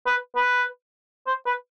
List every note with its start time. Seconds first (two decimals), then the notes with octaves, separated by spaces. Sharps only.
0.06 B4
0.36 B4
1.27 C5
1.46 B4